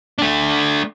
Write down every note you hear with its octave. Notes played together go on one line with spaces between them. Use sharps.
A3 D4